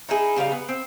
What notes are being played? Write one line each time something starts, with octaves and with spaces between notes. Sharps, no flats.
D#4 E4 G#4
C#3 G3 D#4 F5
B3
C4